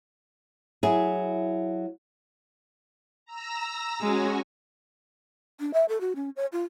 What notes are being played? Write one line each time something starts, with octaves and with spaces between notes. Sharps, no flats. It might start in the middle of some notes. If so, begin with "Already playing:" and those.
F#3 E4 G#4
A#5 E6 A#6
G#3 C#4 F#4 G#5
D4
E5
A4
F#4
C#4
C#5
F4